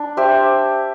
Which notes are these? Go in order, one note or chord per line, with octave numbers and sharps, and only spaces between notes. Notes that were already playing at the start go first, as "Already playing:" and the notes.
Already playing: D4
G4 C5 E5